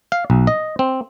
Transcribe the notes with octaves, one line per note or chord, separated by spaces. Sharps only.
F5
B1
D#5
C4